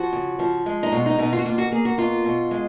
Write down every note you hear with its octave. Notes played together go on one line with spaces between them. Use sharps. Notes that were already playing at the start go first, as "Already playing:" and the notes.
Already playing: F3 F#4
C#3
F3
G#3
D#4
B2 F4
D#4
B2 D#4
F4
F#4
A#3 F4
F#4
A#3 G#4
F#4
B2 F4
B2
G#3